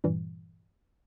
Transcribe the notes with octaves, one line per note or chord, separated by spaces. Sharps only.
G2 A#2 E3 G3